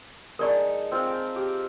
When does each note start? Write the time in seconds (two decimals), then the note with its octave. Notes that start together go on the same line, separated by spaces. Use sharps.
0.39 G#3 D#4 A4 A#4 D5 C#6
0.92 C4 F4
1.07 G5
1.36 G4